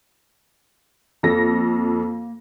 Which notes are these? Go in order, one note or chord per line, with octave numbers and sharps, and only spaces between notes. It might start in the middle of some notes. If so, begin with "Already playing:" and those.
F2 A#3 A4 A#6